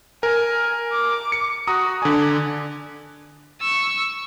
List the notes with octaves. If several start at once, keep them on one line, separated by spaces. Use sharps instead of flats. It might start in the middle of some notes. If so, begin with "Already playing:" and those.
A#4 G#5
D6
C#7
F#4 A#5 D#6
D3 D5 G#5
C#6 E6